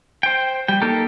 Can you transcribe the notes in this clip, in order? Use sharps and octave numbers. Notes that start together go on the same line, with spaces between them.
C5 G5
G3 G5
A#3 D#4 G4 A4 A#4